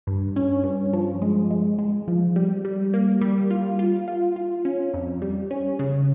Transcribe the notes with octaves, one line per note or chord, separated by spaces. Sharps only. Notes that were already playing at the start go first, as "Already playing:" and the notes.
G2
C#4
G2
F3
G#3
G#3
G#3
F3
G3
G3
A#3
G3
F4
F4
F4
F4
C#4
F2
G3
C#4
C#3